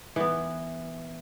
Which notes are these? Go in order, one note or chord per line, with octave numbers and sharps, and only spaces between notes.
E3 B3